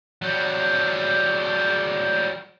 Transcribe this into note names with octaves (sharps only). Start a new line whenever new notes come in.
F#3 G3